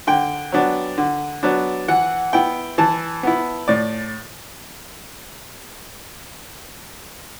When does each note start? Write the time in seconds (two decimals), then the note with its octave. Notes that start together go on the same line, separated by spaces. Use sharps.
0.07 D3 G5
0.52 F#3 B3 D4
0.98 D3
1.43 F#3 B3 D4
1.88 E3 F#5
2.33 B3 E4 G5
2.78 E3 A5
3.23 B3 E4
3.68 A2 D5